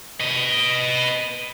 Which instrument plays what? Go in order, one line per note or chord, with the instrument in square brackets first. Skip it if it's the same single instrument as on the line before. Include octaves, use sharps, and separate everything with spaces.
[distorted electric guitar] B4 D#5